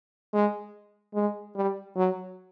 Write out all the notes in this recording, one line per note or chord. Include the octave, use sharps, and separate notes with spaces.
G#3
G#3
G3
F#3